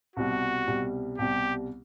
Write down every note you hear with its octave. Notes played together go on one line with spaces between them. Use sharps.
C2 B2 G3 F#4
C2 B2 G3
C2 B2 G3 G4